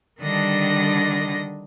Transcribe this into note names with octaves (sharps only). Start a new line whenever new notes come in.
D3 D#3 G3 D4 D#5 A#6